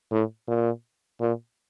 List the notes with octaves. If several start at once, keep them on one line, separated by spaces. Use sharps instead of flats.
A2
A#2
A#2